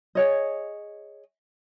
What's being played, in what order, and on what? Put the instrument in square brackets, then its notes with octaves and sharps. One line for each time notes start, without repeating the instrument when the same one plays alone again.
[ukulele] G#4 C#5 D#5